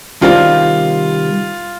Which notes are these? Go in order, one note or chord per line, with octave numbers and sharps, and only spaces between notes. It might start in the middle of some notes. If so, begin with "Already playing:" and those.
C3 D#3 G3 C4 F4 G4